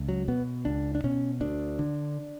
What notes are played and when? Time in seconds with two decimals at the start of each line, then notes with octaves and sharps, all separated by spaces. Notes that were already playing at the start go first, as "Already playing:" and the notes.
Already playing: C#2
0.08 F#3
0.28 B2 B3
0.65 C#2 D4
0.95 D4
1.04 B2 C#4
1.41 D2 D4
1.79 D3